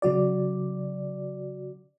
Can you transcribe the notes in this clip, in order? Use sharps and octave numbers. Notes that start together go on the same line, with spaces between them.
C#3 F#3 F#4 D5